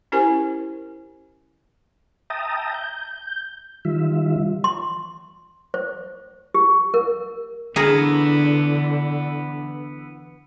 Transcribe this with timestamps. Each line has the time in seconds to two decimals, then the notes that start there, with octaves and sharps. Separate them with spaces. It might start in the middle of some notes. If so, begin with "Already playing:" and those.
0.12 C#4 E4 G4 A#4 C5 G#5
2.30 E5 G5 A5 A#5 D#6
2.74 G6
3.85 D#3 G3 F4 E5
4.64 C6
5.74 C5
6.54 G4
6.94 A#4
7.76 D3 E3 B3 D4 G#4 A#4